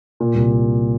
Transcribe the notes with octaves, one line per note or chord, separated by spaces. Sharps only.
A#2
C2